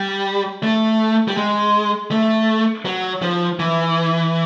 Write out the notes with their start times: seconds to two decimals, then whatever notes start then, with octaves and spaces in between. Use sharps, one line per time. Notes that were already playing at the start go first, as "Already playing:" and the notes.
Already playing: G3
0.63 A3
1.28 G3
1.37 G#3
2.11 A3
2.85 F#3
3.22 F3
3.59 E3